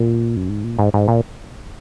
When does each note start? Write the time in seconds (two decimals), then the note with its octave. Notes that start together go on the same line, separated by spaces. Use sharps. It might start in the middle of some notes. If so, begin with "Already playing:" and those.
Already playing: A#2
0.36 F#2
0.49 G#2
0.64 A#2
0.79 G#2
0.94 G#2
1.08 A#2